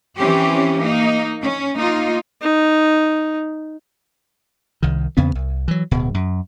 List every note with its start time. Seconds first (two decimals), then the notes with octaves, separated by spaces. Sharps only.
0.16 E3 C4 C#4 G4
0.80 A#3 D#4
1.42 C#4
1.77 A#3 D#4 F4
2.42 D#4
4.83 C2 D#3
5.17 E2 C#3 B3 C4
5.35 C2
5.68 E3 F#3
5.91 D1 B2
6.14 F#2